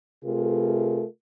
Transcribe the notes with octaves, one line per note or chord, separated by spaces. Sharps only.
C3 A3 F4 G#4 A#4 B4